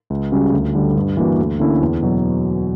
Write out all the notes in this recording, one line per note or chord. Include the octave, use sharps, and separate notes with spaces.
C#2
C#3 G3 C#4 F#4
D2
D3 G3
G2
E3 A#3 D4 F#4
D2
D3 A#3 C#4 E4
E2
B2 F#3